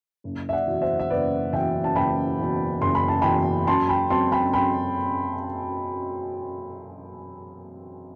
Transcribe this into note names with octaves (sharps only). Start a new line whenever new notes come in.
F#1
E5
D5 F#5
E2 B2
C5 E5
E5
F#1 B4 D5
E2 B2 E5 G5
A5
F#1 G5 B5
E2 B2
F#1 C6
B5
A5
E2 B2 G5 B5
F#2 A5 C6
G5 B5
F#3 C4 A5 C6
G5 B5
F#2 G5 B5